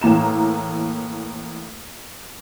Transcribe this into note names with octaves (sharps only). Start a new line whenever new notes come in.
A2 E3 A#3 A#5 E7